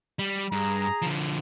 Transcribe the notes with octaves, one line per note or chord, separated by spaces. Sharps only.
G3
G2 G#4 A#5
D3 F3